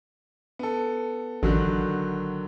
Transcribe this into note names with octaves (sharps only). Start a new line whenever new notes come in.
B3 A4
A1 D3 D#3 F#3